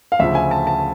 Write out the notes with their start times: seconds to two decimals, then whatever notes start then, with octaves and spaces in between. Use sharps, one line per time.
0.12 F5
0.19 D2 C#3 F3 E5
0.35 G#5
0.51 A5
0.67 A5